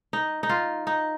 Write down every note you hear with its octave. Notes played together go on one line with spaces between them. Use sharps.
D#4
D#4
F4
D#4